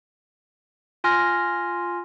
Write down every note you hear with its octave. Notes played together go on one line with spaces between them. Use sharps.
F4 G#5 C6 F6 A#6